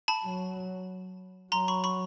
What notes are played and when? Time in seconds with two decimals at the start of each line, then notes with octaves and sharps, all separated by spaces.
0.08 A5 B5
0.24 F#3
1.52 F#3 A#5 C6
1.68 B5 C#6
1.84 B5 C#6